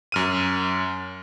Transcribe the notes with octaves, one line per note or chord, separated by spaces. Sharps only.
F#2 F6 D#7